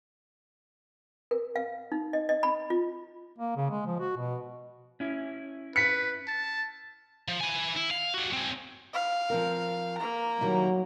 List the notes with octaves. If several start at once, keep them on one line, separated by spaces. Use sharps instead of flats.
A#4
F5
D#4
D#5
D#5
B5
F4
A#3
C#3
G#3
F3
F#4
B2
C#4 E4
B4 B6 C#7
A5
F3
E4 G#5
E4
F5
G3 F#4
C4 G#4
F5
F3 C4 A#4
A#3 A#5
D#3 F#3 G3 E4